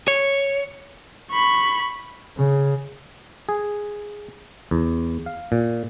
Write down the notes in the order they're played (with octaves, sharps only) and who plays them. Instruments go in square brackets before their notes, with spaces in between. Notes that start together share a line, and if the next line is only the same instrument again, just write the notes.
[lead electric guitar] C#5
[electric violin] B5 C#6
[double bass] C#3
[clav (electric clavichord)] G#4
E2
F5
A#2